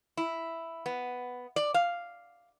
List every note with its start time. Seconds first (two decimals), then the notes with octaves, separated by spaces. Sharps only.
0.17 E4
0.86 B3
1.56 D5
1.74 F5